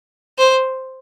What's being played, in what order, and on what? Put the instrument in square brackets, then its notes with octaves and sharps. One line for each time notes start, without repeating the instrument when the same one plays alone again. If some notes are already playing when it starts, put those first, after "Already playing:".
[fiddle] C5